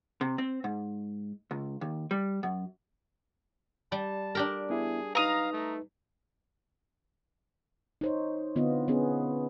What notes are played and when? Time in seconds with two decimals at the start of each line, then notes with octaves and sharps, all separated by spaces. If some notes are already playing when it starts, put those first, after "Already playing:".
0.21 C3
0.38 C4
0.64 G#2
1.51 C#2
1.81 D#2
2.11 G3
2.43 F#2
3.92 G3 A5
4.35 D4 G4 A#4
4.70 B3 E4 G#4
5.15 D#4 B4 F5 A#5 D#6
5.53 A3
8.01 D#4 C5 C#5
8.56 D3 B3 C4 F4 D#5
8.88 B3 C#4 G#4